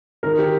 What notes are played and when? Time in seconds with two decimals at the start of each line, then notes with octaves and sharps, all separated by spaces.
0.23 D#3 A#4
0.39 G4